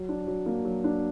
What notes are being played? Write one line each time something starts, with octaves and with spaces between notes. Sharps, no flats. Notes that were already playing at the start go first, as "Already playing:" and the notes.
Already playing: F#3
D4
F#3
A#3
F#3
D4